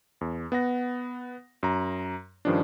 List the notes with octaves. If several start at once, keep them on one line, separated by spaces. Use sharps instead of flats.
E2
B3 F#5 A#6
F#2 A#5
G2 D#3 F3 C#4 D4